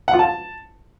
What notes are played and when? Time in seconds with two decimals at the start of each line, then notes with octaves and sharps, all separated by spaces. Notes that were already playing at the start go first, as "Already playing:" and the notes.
0.08 F#5
0.13 F4
0.19 A5